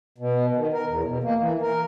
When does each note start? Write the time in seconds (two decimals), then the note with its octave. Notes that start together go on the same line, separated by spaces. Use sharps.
0.18 B2
0.56 D#3
0.73 A#4
0.87 E2
1.05 B2
1.24 A#3
1.40 E3
1.61 A#4